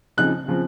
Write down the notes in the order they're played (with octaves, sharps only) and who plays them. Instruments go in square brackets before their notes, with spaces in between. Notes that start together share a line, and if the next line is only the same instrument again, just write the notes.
[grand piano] C#3 F3 C4 D#4 F#6
C#3 F3 C4